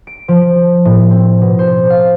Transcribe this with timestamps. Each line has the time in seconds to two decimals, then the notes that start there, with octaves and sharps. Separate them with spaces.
0.07 D7
0.28 F3
0.85 A2
1.11 C4
1.42 B2
1.59 C5
1.90 F5